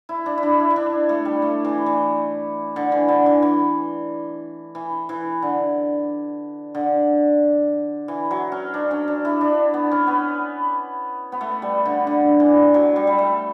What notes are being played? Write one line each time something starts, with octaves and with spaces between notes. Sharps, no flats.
E4
D4
E4
D4
E4
E4
D4
A3
G3
A3
E3
E3
D3
E3
D3
E3
E3
E3
E3
D3
D3
E3
F#3
C#4
D4
C#4
D4
E4
D4
B3
C#4
B3
B3
A3
G3
D3
D3
E3
F#3
G3
G3
A3